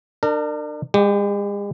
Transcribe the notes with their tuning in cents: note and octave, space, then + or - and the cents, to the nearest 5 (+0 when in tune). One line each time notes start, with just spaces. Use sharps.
D4 +30 A#4 -30
G#3 -45 G4 +0